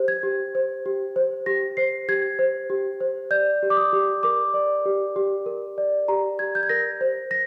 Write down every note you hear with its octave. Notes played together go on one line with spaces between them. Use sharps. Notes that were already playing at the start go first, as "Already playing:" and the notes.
Already playing: G4 C5
G#6
G4
C5
G4
C5
G4 A#6
C5 C7
G4 G#6
C5
G4
C5
D5 G6
G4
D6
D#6
G4
A#4 D6
D5
G4
G4
A#4
D5
G4 A#5
G4 G#6
G6
G#6
A#4 A#6
C5
A#6